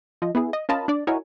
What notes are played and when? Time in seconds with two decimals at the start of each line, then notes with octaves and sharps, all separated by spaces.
0.22 F3 D#5
0.35 B3 E4 G#4
0.53 D#5
0.69 C#4 F4 A#4 D#5 A5 B5
0.88 D4 D5
1.07 D#4 E4 F#4 A#4 C#5 G#5